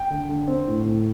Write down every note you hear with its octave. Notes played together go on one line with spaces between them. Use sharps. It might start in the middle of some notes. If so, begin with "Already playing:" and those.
Already playing: G5
D3
D3
C4
A2
A2